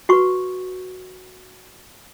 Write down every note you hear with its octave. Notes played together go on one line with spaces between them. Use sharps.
F#4 B4 C#6